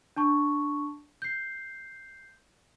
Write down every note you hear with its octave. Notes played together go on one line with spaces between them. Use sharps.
D4 A5 C#6
G6 C7